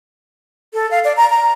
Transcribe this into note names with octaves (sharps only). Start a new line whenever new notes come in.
A4
F5
D5
A#5
A#5